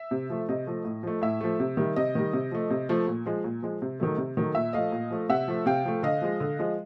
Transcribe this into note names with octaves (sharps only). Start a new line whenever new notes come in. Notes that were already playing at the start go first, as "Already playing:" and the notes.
Already playing: E5
C3
F3 A3
C3 D#5
F3 A3
A2
F3 A3
A2 E5
F3 A3
C3
D#3 G3
C3 D#5
D#3 G3
C3
F3 A3
C3
F3 A3
A#2
F3 G#3
A#2
F3 G#3
C3
D#3 F#3 A3
C3
D#3 F#3 A3
A#2 E5
F3 A3 D#5 F5
A#2
F3 A3
C3 E5 F#5
F3 A3
C3 F5 G5
F3 A3
D3 D#5 F5
F3 G#3
D3
F3 G#3